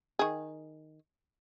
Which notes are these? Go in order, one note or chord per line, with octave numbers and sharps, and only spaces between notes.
D#3 G#4